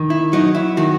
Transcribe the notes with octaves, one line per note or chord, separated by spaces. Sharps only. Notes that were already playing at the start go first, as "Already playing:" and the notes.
Already playing: D#3
E4
F#3 D#4
E4
D#3 F#4